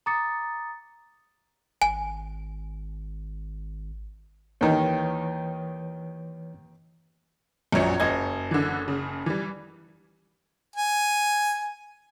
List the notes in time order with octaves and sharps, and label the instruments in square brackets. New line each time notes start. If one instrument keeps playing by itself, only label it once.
[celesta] A#5 D6 D#6 A6 C#7
[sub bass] G#1 [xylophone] G#5
[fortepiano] D#2 D#3 D#4 [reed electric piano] E3 B4 C#5
[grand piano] A#1 F#2 [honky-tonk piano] C#5 A#5 C#7
[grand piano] F#1 D#5 G#6
[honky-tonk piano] D3 E3
C#3
E3 G3
[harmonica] G#5